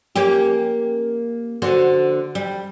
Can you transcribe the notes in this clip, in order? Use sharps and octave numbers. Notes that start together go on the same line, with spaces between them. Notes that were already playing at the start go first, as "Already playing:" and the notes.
A#3 C#4 G4
D3 F#4 C5
G3